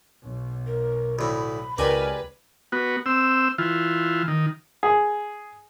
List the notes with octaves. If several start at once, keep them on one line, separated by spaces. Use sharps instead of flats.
B1
A#4
D2 A2 B5
C#2 G4 A#4 B4 D5 G#5
B3 F#4
C4 E6
E3 F4
D#3
G#4